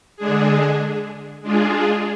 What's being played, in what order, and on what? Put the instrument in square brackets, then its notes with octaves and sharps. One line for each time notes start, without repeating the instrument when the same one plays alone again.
[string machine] D3 G#3 D4 G#4
G#3 D4 F4 G#4